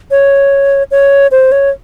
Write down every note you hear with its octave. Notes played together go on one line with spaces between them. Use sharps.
C#5
C#5
C5
C#5